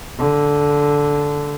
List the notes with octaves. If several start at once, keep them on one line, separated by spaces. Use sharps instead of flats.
D3